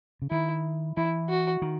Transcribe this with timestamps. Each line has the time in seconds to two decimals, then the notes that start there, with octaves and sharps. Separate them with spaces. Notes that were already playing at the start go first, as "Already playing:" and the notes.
0.22 C#3
0.30 D#3 E4
0.97 E3 E4
1.29 F#4
1.62 D#3